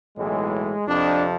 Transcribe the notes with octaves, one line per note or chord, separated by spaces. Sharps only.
B1 A2 E3 G#3
F2 C3 F3 D4